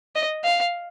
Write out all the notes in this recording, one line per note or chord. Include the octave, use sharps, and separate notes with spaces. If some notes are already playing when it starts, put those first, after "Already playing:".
D#5
F5